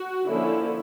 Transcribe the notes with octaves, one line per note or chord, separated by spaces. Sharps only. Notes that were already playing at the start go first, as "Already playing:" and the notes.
Already playing: F#4
D3 F3 A#3 C#4 E4